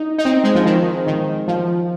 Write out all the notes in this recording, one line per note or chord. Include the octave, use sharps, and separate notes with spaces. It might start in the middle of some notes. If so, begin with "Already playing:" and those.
Already playing: D#4
D#4
C4
G#3
F3
D#3
D#3
F3